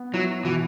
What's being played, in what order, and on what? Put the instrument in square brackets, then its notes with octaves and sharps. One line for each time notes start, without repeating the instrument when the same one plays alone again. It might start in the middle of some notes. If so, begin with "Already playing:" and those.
Already playing: [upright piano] B3
[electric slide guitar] F#3 [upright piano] E4
[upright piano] B2 [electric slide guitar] E3